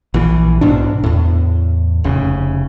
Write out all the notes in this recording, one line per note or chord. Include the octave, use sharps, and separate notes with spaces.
A#1 E3
B1 G#2 B2 D4
E2 A2
F1 C#3